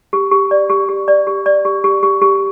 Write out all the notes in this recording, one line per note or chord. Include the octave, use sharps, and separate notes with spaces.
G4
G4
D5
G4
G4
D5
G4
D5
G4
G4
G4
G4